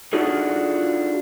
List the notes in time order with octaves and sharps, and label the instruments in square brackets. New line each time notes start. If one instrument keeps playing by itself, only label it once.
[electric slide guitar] D4 D#4 F4 F#4 G#4 A4